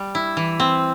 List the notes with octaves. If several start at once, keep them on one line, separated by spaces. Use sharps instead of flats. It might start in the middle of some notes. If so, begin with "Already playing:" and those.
Already playing: G3
E4
E3
C4